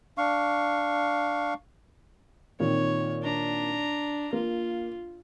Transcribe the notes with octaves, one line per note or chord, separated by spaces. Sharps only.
D4 F5 C#6
A#2 D#3 C4 C#5
D4 A#5
A#3 F4